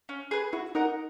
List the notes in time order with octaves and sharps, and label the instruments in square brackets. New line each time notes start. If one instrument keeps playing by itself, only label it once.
[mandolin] C#4
G#4 B4
[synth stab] E4 [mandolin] F#4
[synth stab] D#4 [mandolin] A#4 D#5 F#5